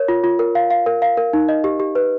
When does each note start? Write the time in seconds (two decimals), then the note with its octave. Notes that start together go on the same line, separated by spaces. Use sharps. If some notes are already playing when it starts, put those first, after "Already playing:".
Already playing: A#4 C#5
0.08 F4
0.24 F4
0.39 A#4
0.55 F5
0.71 F5
0.86 A#4
1.02 F5
1.17 A#4
1.33 D#4
1.49 D#5
1.64 G4
1.80 G4
1.95 B4